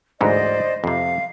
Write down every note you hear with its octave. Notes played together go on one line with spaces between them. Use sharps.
D2 G#2 E3 C5 D5 D#5
F2 C3 F5